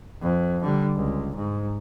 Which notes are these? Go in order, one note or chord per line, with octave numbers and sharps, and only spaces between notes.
F2
D3 G3
C#2
G#2